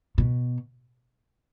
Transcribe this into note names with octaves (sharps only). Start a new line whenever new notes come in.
B2